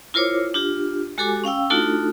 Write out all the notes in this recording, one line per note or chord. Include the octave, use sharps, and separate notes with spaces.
E4 F4 A#4 C5 C#5 D6
D4 F4 G4
G#3 F#4 G4 A4 G#5 D6
C#4 F5 G5 E6
A3 D4 D#4 F4 F#4 A4